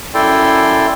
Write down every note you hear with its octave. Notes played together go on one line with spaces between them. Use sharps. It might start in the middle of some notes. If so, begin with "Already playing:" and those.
F#2 E4 A4 D5 G5 C6